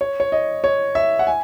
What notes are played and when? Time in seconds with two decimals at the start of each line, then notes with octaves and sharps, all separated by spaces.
0.01 C#5
0.20 C#5
0.32 D#5
0.64 C#5
0.95 E5
1.19 F#5
1.27 G#5